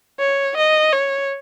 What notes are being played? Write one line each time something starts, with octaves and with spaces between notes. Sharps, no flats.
C#5
D#5
C#5